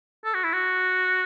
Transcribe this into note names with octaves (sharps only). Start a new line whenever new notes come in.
A4
F#4
E4
F#4